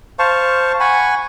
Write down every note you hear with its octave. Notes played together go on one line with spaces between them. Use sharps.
C5 F5 A5 C#6
F#5 G#5 B5 C#6